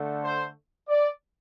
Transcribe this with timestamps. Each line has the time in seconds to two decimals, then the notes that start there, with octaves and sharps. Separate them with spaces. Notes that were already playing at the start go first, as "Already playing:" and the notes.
Already playing: D3 A3
0.24 C5
0.88 D5